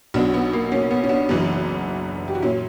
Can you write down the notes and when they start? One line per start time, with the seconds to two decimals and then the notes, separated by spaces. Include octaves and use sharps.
0.14 B1 B2 F#3 B3 D4
0.34 B3
0.53 A#3
0.72 A#3 C#4
0.91 B3
1.04 C#4
1.09 B3 D4
1.29 F#1 F#2 E3
2.28 G4
2.35 F#4
2.42 A#2 F#3 C#4 E4